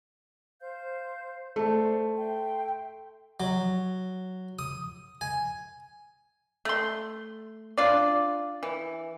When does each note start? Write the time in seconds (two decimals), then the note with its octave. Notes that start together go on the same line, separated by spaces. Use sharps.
0.60 C5 F5 G6
1.56 A3 C5 D5
2.18 E5 G5 C6
3.40 F#3
4.59 D#6
5.21 G#5
6.65 A3 C6
7.78 D4 F4 D5
8.63 E3